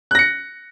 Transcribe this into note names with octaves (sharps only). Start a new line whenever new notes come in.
F#6 A#6 C#7